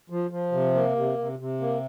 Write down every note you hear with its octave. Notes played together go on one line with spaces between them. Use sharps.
F3
F3
C3
A#3
C3
C3
C3
A#3